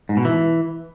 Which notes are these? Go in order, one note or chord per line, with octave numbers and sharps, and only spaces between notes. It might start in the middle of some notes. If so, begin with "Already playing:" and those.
G#2
B2
E3